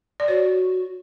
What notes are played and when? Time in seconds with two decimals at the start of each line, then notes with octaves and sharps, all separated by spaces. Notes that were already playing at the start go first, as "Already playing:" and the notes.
0.20 D5
0.28 F#4 C#5